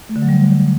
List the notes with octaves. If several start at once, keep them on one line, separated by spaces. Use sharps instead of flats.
A3
D3
F#3
G3